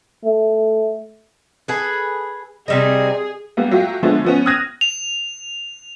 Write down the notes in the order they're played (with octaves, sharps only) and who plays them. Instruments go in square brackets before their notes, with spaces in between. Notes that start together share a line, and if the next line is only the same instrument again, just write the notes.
[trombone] A3
[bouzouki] G#4 A4 B4
[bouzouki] C3 G3 D#4 [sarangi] G#4
[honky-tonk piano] G3 A#3 B3
F#3 A3 F4 G4
D3 F3 G#3 A3 B3 D4
F3 B3 C#4
D#6 F6 F#6 G#6 A#6 D#7
[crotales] F7